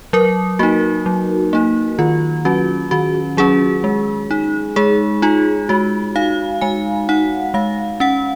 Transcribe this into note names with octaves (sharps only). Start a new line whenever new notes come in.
F#3 A#4
A#3 D#4 F#4
F#3
A#3 D#4
D#3 F4
F#3 C#4 F#4
D#3 F#4
F#3 C#4 G#4
G#3
D#4
G#3 G#4
D#4 F4
G#3 F#4
D#4 F5
G#3 G#5
D#4 F#5
G#3 F5
C#4 F#5